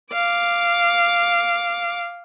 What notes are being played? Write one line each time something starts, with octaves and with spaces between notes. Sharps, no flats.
F5 D6